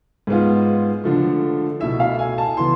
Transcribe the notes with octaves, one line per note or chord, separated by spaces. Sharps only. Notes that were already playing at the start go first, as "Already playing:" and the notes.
G#2 G#3 B3 F4
D3 F3 A3
B2 A3 E4 E5
F5
G#5
A5
E3 B3 E4 C6